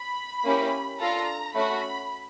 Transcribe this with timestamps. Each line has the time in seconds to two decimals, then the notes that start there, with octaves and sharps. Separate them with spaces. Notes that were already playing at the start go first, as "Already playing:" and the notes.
Already playing: B5
0.44 A#3 C#4 E4 G4
0.99 D4 F4 A4 A#5
1.54 A3 C#4 F#4 B5